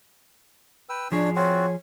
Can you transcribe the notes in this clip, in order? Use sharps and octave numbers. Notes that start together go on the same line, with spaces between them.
B4 G5 E6
F3 D4 G#4 C#5
C4 F4 F#4 C#5